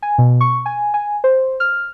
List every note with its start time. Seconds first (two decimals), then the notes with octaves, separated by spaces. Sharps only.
0.02 G#5
0.18 B2
0.41 C#6
0.66 G#5
0.94 G#5
1.24 C5
1.60 F6